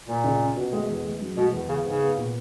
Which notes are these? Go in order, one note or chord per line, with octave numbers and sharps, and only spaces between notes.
A#2 A#3
C#2
C#4
B2
G#3
E2
G#3
F#2
B2 G#3
E2
C#3 B3
G#2 C#3
B3
A#2